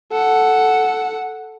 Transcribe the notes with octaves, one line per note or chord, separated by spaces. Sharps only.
A4 F#5